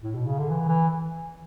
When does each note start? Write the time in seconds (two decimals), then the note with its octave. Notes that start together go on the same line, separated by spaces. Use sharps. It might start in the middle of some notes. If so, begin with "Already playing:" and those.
0.03 A2
0.15 B2
0.26 C#3
0.38 D3
0.50 E3
0.68 E3